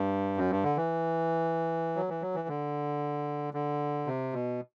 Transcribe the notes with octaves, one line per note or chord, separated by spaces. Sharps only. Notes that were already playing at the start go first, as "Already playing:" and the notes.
Already playing: G2
F#2
G2
D3
E3
F#3
E3
F#3
E3
D3
D3
C3
B2